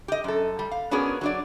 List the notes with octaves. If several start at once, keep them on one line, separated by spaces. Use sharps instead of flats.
G4 D#5
F#2 A4
G3
F5
B3 C#4 D4 F#4 G#4 A#4
F#3 D4 D5